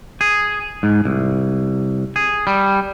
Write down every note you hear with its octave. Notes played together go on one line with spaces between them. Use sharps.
G#4
G#2
C2
G#4
G3